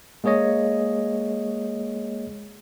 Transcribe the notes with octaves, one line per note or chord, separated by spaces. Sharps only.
G#3 A#3 G#4 C#5 D#5